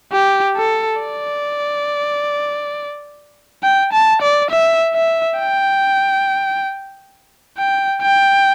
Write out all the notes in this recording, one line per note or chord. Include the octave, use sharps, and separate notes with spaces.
G4
A4
D5
G5
A5
D5
E5
E5
G5
G5
G5